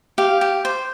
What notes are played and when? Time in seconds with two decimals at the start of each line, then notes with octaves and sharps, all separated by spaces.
0.18 G4 F5
0.41 G4
0.65 C5